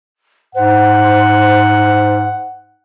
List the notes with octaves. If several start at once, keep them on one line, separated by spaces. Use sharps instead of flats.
G#2 C5 F#5